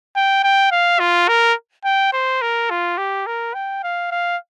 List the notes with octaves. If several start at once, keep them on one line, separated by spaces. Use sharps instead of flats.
G5
G5
F5
F4
A#4
G5
C5
A#4
F4
G4
A#4
G5
F5
F5